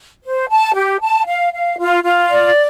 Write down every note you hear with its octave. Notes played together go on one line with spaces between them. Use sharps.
C5
A5
G4
A5
F5
F5
F4
F4
D5